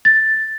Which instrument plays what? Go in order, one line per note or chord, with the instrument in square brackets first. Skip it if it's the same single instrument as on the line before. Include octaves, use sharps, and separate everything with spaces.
[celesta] A6